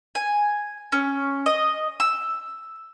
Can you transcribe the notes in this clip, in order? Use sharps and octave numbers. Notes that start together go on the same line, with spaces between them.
G#5
C#4
D#5
E6